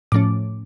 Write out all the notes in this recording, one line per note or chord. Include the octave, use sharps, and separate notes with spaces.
A2 F3 A3 C#4 D6